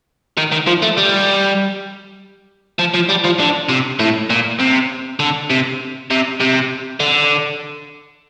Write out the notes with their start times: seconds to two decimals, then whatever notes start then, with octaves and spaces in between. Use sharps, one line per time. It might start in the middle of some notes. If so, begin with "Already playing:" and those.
0.38 D#3
0.52 D#3
0.67 F3
0.83 A3
0.98 G3
2.79 F3
2.94 F3
3.09 G3
3.24 F3
3.39 D3
3.69 C3
3.99 A2
4.30 A#2
4.59 C3
5.19 D3
5.50 C3
6.10 C3
6.40 C3
7.00 D3